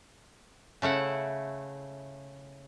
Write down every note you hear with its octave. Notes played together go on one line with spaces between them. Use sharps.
C#3 A3 E4 F#5